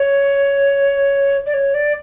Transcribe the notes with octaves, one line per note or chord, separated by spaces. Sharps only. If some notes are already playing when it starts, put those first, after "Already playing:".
Already playing: C#5
D5
C#5
D5